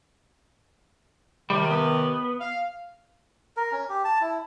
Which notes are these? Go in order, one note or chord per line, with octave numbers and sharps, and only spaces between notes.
D#2 C3 D#3 G3
B3
F5
A#4
C#4
G4
A5
E4